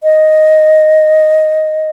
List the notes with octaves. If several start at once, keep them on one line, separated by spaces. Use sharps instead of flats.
D#5